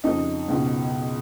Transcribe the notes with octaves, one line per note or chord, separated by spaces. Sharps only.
F2 C#3 D#4
C#2 B2